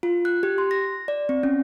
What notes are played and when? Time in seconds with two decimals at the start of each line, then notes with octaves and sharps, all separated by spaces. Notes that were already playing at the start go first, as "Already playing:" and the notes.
0.03 F4
0.25 F#6
0.43 G4
0.58 C6
0.71 A#6
1.08 D5
1.29 C4
1.43 C#4